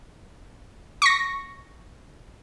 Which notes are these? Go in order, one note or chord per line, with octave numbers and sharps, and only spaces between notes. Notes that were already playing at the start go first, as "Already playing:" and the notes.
C#6 A#6